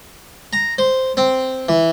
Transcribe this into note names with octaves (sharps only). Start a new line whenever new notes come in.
A#5
C5
C4
E3